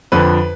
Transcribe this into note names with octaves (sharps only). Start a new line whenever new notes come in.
F2 D3 F3 B4